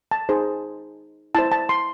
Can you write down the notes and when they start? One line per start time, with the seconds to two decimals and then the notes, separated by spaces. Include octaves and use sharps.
0.11 A5
0.29 D#4 G#4 C5
1.35 E4 C5 A5
1.52 A5
1.69 C6